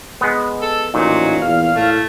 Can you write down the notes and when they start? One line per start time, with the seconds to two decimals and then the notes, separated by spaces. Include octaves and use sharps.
0.21 G#3 B3
0.62 A4
0.94 A1 A#2 F#3 D#4
1.42 E2 F5
1.76 A2 A3